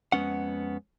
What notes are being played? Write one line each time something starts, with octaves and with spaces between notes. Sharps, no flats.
F2 G#3 B3 C#4 F#5